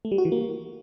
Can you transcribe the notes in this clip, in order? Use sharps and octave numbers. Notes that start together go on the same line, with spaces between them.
A3
G3
F#4
E3
A#3